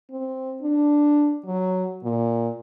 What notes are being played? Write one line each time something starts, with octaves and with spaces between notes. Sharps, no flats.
C4
D4
F#3
A#2